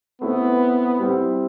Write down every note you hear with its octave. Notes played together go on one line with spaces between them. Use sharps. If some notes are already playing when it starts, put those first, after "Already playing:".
A3 B3 C4 E4 B4
G3 C4 E4